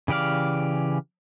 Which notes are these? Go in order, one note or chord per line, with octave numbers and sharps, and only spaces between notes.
C#3 E3 G4 D5 F5